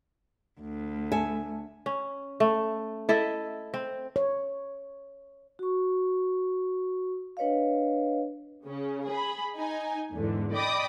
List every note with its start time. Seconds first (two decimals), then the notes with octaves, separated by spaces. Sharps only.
0.61 D2
1.12 A4 E5 G#5
1.86 C#4
2.40 A3
3.09 E4 A4 D#5 E5
3.74 C4
4.16 C#5
5.59 F#4 C#6
7.37 D4 B4 C#5 D#5 F5
8.66 C#3 C#4
9.06 G#4 B5
9.56 D#4 G#5
10.14 E2 G#2 D3
10.52 D5 D#5 G5 B5 D6 D#6